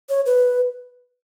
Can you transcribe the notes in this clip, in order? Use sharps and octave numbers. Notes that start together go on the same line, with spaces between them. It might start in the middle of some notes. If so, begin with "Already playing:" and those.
C#5
B4